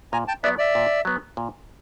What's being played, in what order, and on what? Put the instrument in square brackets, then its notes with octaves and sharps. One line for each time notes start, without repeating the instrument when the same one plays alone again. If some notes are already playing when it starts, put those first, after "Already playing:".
[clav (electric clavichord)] A#2 [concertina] G#5 A#5
[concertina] G5 A5
[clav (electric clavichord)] F#3 B3 [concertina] D5 E5
[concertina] D5 E5
[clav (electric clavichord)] A#2
F#3 B3
A#2